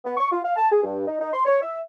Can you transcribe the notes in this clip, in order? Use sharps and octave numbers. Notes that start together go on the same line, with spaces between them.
B3
C#6
F4
F5
A5
G#4
G2
D#4
D#4
C6
C#5
E5